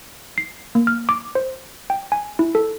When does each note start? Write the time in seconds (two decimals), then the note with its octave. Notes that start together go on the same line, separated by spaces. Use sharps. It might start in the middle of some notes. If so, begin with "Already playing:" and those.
0.38 C7
0.75 A#3
0.87 F6
1.09 D6
1.35 C5
1.90 G5
2.12 G#5
2.39 E4
2.55 A4